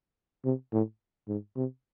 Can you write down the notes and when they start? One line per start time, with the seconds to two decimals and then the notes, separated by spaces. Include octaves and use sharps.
0.44 C3
0.73 A2
1.28 G#2
1.56 C3